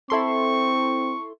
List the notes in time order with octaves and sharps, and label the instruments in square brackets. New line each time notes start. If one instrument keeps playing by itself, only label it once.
[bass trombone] C4 [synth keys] E4 A4 C6 [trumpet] C#6